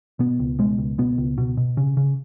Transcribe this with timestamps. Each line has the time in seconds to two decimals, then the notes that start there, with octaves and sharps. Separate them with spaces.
0.19 B2 B3
0.39 C#2
0.59 B2 G#3
0.78 C#2
0.98 B2 B3
1.18 C#2
1.38 B2
1.57 B2
1.77 C#3
1.97 C#3